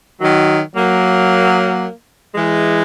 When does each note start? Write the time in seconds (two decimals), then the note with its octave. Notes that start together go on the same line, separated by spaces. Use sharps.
0.21 D#3 F#3
0.74 F#3 A#3
2.34 E3 G#3